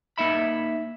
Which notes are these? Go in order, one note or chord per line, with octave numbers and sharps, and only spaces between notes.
A#3 D#4 E5 B5